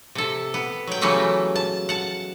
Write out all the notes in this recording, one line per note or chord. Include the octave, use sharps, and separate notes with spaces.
C3 A4
B3
F#3 G5
C#3 E3 F#3 G3 A3 B3
A5
F#5 A5